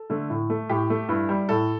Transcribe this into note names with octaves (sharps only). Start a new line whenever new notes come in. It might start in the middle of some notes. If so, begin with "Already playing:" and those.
Already playing: A4
D3 A3
A2
A3
A2 G4
A3
G2 E4
G3
A2 A4